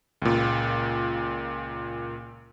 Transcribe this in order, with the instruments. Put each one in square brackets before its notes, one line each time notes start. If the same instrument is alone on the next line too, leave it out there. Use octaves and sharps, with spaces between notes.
[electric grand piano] C#2 A#2